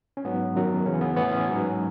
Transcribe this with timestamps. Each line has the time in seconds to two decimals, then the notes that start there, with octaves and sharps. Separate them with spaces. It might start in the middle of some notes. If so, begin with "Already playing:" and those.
0.17 C#4
0.24 G#2 F#3 B3
0.56 F#2 D#3 F#3
0.85 E2 C#3 E3 C#4
1.01 B3
1.16 A2 E3 B3
1.31 C#4
1.47 G#2 F#3